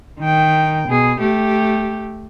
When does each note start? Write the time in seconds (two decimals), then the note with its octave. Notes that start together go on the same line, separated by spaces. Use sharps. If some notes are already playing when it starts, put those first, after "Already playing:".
0.20 D#3 G5
0.88 B2 G#4
1.20 A3 G4